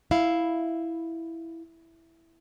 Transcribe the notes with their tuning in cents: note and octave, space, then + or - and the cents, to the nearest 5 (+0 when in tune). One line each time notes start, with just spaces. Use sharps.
E4 +0 F5 +0